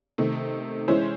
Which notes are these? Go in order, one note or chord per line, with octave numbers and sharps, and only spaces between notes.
C3 D#3 A3
E3 G#3 C#4 E4 C5